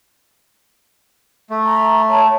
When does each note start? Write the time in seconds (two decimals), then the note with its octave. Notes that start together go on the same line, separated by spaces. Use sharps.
1.50 A3
1.66 A#5
2.09 C#5 A5